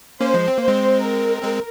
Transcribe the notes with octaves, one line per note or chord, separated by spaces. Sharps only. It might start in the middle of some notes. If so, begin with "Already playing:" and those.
A#3 C#4 C5
F3 G#3
C4
A#3 C5
G#3 C4
A#4
G#3 C4